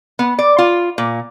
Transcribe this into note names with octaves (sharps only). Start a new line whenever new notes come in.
B3
D5
F4
A#2